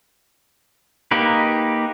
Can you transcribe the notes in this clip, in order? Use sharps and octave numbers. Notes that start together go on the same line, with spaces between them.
A#3 D#4 G4 B4